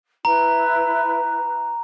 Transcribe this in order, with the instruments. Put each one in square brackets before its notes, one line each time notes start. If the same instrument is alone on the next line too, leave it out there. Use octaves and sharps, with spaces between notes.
[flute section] E4 B4 [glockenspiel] A#5